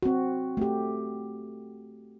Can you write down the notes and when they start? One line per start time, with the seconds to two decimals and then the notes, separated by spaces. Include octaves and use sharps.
0.02 C4 F#4
0.57 A3 G4